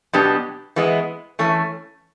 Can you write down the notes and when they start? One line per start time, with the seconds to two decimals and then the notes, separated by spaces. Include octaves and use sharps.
0.13 B2 F#3 B3 D4 G4
0.76 E3 G#3 B3
1.39 E3 A3 C#4